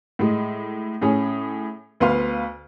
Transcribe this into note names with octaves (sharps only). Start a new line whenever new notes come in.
A2 G#3
A2 C#4 G#4
D2 B3 F5 C6 F6